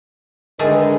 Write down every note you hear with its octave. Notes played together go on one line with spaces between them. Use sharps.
D3 D#3 G#3 A3 G#4 B4